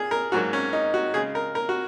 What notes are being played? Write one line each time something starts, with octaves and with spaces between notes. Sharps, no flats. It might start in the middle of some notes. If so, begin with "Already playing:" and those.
Already playing: A#2 G#4
A#4
G#2 F#3 A#3 F#4
C#4
D#4
F#4
C#3 G#3 G#4
A#4
A#4
F#4